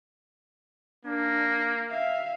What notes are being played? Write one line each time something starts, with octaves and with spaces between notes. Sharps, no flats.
A#3 D4
E5 F5